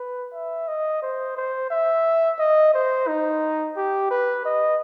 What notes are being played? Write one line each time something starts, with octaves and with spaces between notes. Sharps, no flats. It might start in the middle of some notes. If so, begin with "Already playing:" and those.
Already playing: B4
E5
D#5
C5
C5
E5
D#5
C5
D#4
G4
B4
D#5